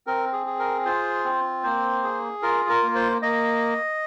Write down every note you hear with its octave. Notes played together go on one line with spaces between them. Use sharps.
C4 A#4
G#4
G#4
A#4
F4 C5
C4
A#3 C5
G#4
F4 A#4
A#4
A#3
C5
A#3 D#5